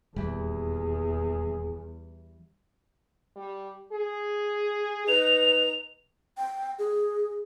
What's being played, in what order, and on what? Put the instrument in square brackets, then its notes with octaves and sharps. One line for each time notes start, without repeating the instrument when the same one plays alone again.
[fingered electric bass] D#1 [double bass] E2 [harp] E3 G3 [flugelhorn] G#4
[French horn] G3
G#4
[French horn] D#4 [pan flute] B4 [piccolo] F7
[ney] G5
G#4